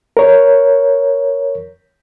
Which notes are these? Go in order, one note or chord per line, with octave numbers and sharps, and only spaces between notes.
A#4 C#5